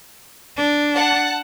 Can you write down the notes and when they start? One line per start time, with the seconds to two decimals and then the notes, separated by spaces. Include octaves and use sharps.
0.57 D4
0.94 F#5 A5